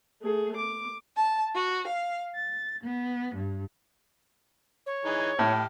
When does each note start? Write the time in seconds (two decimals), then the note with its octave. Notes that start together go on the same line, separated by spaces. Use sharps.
0.22 A3 G#4
0.57 D6
1.17 A5
1.55 F#4
1.87 F5
2.34 A6
2.82 B3
3.34 G2
4.86 C#5
5.05 E3 D#4 G#4
5.39 A2 G4 F6